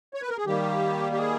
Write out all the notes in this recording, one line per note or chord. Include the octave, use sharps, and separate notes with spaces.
C#5
B4
A#4
G#4
D#3 G3 A#3 G4
G4
G#4